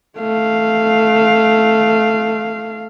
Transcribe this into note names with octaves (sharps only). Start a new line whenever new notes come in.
A3 F5